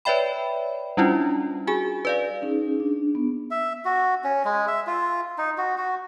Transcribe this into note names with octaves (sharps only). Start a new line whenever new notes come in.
B4 C#5 D5 E5 G5 B5
G3 C#4 D4 E4 F4
F#4 G#4 G#5
B4 D5 F5
C#4 D#4 G#4
D4
B3
E5
F#4
C#4
G#3
E5
F4
D#4
F#4
F#4